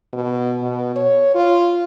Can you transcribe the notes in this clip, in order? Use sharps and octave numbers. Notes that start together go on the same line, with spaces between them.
B2
B2
C#5
F4